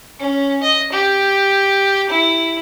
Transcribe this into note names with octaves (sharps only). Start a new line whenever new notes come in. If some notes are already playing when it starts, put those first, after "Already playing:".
C#4
D#5
G4
E4